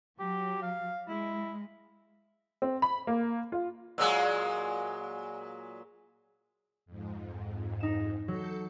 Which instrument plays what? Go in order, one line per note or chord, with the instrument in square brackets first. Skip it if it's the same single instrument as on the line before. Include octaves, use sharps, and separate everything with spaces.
[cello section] F#3 [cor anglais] G4
[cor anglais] F5
[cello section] G#3 [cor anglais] E4
[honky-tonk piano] C4
B5
A#3
F4
[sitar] A#2 F#3 G#3
[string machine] F2 G#2
[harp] D#4 E7
[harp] F#3 [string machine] A4 G6 C#7